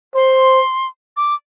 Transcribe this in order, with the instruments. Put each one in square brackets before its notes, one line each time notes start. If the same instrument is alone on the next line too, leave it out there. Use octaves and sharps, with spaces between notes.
[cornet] C5 [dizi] C6
[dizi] D6